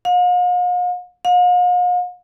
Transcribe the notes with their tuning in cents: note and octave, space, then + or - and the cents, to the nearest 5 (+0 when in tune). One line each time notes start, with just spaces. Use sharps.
F5 +45
F5 +45